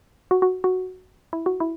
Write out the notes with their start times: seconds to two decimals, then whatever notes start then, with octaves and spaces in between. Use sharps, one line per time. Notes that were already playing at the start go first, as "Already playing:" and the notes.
0.31 F#4
0.42 F#4
0.64 F#4
1.33 E4
1.46 F#4
1.60 E4